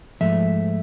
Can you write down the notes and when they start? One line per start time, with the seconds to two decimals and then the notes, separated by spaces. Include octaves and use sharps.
0.21 G#2 F3 A3 E5